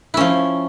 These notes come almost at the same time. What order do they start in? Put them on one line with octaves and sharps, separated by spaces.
E4 C#4 F3